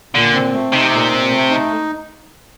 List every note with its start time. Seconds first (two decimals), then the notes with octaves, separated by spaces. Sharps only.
0.14 A#2 D3
0.34 C4
0.53 A3
0.72 C3 D#4
0.93 A#2
1.12 C4
1.31 A3
1.50 D#4